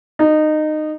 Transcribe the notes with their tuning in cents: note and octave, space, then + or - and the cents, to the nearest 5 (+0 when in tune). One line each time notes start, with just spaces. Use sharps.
D#4 -20